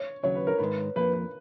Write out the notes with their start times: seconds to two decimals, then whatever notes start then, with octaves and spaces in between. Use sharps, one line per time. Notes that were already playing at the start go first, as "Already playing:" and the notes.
Already playing: C#5
0.23 D#2 C#3 F#3 C#5
0.35 B4
0.47 A#4
0.58 G#2 D#3 G#3 B4
0.96 F2 F3 A#3 B4
1.13 B4